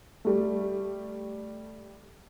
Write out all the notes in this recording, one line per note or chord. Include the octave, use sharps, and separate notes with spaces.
G3 A3